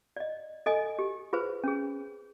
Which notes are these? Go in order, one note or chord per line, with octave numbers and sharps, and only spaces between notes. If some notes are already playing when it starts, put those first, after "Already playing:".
D5 D#5
A4 D#5 G#5
G4
F4 G#4 B4 C5
C#4 G#4